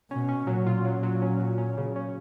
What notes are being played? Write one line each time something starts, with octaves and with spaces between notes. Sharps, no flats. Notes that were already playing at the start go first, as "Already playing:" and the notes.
B2 C#4
C#4
A#2 F#3
F4
F#3
F#3
C#4
F#3
C#4
C#3
C#4